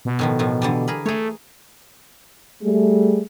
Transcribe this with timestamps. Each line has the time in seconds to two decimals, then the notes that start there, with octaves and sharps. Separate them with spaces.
0.05 B2
0.19 A2 D#3 F3
0.39 A2 D#3 F3
0.62 D3 E3 G3
0.88 G#4 A#4 B5
1.06 A3 G#4 C#5
2.62 G3 A3 G#4